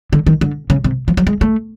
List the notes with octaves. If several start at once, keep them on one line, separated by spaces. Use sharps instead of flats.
D3
D#3
D3
C#3
C3
F3
F#3
G#3
A3